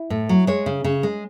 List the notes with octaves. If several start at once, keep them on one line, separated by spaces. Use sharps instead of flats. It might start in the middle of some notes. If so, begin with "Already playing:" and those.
Already playing: E4
A2
F#3
G#3 C#5
C#3
C#3
G#3